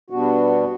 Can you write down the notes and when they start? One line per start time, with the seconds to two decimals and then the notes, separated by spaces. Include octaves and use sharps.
0.10 B2 G3 B3 D4 F#4